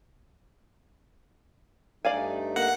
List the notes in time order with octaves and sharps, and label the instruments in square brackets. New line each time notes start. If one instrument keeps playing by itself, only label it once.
[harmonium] G2 A3 D#4 [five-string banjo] D5 F5 G#5
[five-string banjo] A#3 [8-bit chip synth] F#5